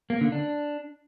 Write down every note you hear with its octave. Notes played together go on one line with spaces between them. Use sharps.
A#3
D3
D4